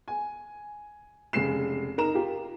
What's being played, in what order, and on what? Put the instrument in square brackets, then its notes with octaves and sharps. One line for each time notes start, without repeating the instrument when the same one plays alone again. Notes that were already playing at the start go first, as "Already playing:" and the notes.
[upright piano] G#5
F1 C#3 G#3 C7 E7
D#4 A#4 A#5 E7
F4 G4